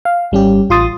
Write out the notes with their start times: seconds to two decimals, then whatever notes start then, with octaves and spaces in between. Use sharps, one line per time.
0.05 F5
0.32 G#1 G3 C#4 G4
0.70 A1 F4 C6 D#6 A6